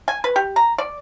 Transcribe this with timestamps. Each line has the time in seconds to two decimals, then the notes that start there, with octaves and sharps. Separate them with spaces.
0.08 G#5
0.24 B4
0.36 G4
0.56 A#5
0.78 D5